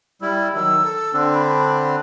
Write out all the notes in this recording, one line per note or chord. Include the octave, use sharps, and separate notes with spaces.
G3 E4 E6
D#3 F#3 E6
A4
D3 C4 D4
B5